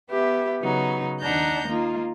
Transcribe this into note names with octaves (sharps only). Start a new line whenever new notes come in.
B3 G4 B4 E5
C#3 F#3 B3 D#4
D#2 D4 D#4 F#5 A#5 G6
A#3 D#4 F4